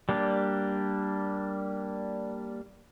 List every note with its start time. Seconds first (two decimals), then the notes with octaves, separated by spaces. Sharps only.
0.09 G3 A#3 D4